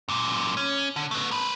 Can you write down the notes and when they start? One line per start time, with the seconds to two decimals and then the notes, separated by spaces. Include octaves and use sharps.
0.08 F#2 A#2
0.57 C#4
0.96 D3
1.11 A3 B3
1.31 A#4 B4